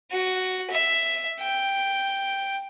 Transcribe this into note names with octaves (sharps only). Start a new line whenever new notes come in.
F#4
E5
G5